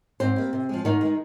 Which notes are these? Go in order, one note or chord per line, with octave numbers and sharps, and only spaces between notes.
G#2 C4 C5
G3 A#3
C3
F3 G#3
G#2 D#3 D#4
D#3 G#3